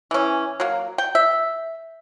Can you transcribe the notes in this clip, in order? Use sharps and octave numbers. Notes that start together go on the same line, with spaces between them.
E3 C#4
F#3 A#3
G5
E5